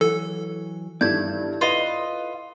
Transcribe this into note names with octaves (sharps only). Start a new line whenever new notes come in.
E3 F#3 A4
G2 D#3 E4 A4 D5 G6 G#6
F4 B4 D#5